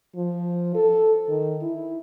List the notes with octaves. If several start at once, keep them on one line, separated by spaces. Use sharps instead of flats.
F3
A4
D#3
E4